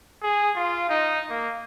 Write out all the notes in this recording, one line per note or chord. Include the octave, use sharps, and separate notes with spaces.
G#4
F4
D#4
A#3